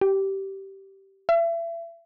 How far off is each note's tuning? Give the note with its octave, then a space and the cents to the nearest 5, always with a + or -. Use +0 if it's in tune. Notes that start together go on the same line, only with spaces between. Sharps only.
G4 -15
E5 +35